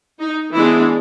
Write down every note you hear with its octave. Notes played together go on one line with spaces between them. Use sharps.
D#4
E3 G#3 B3 D4 E4